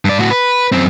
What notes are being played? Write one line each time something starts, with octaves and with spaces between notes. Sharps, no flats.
G2 D5
A2 F#4
B4
F#2 C4